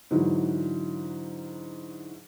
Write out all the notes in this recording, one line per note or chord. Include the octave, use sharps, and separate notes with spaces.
G#2 D3 E3 F#3